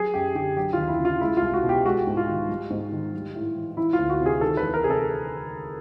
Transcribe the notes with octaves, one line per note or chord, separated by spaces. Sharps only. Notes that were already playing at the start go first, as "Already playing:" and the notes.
Already playing: F#3 G#4
F#2 G4
D3 G4
F#3 G4
D#2 F4
E4
C#3
F4
G#3 E4
C2 F4
F#4
B2
G4
G#3 F#4
G#2
F4
D#3
G3
G#2
D#3
G3
A2
E3
E3 E4
F4
D2
F#4
C3
G#4
D#3 A4
B4
E2
A#4
C3 G#4
A4